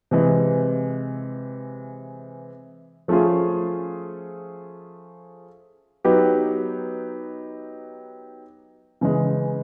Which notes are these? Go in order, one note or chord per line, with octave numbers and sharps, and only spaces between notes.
C3 E3 G#3
F3 A3 C#4 F4 G#4
F#3 B3 D#4 G4 B4
C#3 E3 G#3